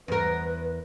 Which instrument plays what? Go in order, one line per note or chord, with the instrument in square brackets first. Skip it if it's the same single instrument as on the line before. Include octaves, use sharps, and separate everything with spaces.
[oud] E2 A#4 [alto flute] B4